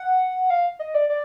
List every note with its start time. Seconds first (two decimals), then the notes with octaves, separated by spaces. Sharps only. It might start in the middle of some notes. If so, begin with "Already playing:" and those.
Already playing: F#5
0.50 F5
0.79 D#5
0.94 D5
1.09 D5